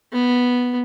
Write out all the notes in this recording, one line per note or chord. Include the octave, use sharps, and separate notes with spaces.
B3